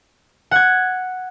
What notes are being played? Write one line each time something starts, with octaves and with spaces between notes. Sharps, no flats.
F#5 G#6